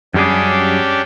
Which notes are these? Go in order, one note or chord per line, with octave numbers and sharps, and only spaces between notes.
F#2 G3 C#4 D4 G4 G#4